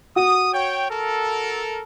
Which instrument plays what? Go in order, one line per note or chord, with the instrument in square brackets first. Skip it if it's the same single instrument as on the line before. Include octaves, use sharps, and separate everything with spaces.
[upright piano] F#4 [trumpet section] D#6
[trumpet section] C#5 G5
A4 A#4